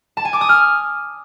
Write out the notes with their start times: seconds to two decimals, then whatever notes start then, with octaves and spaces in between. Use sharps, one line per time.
0.17 A5
0.25 G#5
0.33 D6
0.41 D#6
0.49 F6